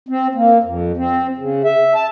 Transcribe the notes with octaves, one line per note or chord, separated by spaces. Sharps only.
C4
A#3
F2
C4
C#3
E5
A5